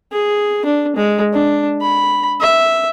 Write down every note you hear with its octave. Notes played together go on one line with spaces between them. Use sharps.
G#4
D4
G#3
D4
B5
E5